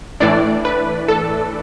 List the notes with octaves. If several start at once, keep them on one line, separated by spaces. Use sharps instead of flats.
A2 E3 A3 D4 D5
B4
A4